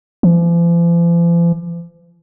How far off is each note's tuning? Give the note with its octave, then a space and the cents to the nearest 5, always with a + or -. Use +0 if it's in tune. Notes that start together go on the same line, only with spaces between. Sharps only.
F3 -45